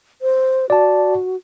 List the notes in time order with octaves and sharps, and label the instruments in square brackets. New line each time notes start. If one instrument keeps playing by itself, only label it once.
[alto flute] C5
[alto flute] F#4 [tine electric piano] D5 A5